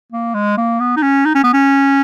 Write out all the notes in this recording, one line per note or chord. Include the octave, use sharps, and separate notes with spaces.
A#3
G#3
A#3
B3
D#4
C#4
D#4
C#4
B3
C#4